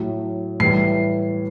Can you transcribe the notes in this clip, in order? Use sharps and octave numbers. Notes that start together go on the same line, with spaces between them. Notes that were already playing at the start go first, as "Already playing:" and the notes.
Already playing: A2 F#3
A2 E3 G3 C7